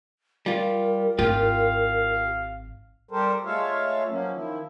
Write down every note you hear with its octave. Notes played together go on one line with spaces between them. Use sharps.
G3 F4 A#4
G#1 E4 F4 G4 F5
G3 G4 A4 A#4 C5
G#3 A3 F4 C#5 E5 F5
F3 F#3 A#3 C#4
D#3 F3 E4